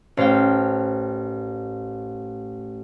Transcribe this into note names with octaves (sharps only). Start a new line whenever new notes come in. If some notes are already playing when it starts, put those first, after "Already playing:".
A1 C5 F5 G5